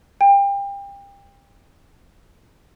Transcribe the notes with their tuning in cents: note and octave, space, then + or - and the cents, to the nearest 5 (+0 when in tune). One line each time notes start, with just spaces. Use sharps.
G5 +30